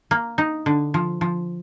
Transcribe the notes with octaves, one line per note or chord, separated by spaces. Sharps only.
A#3
D#4
D3
F3
F3